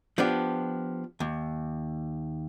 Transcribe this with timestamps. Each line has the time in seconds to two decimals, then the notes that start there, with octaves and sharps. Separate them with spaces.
0.18 F3 B3 D4 G4
1.20 D#2